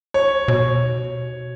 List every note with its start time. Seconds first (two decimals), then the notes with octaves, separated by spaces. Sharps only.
0.14 C#5
0.48 B2 C#5